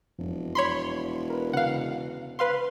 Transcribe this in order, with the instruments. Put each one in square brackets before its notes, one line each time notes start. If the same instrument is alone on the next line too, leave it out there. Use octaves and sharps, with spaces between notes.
[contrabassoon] E1 [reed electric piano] F2
[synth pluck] C#5 B5 C6
[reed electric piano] A#4 B4
[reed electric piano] C#3 [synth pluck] F5 F#5
[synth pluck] B4 F5 C6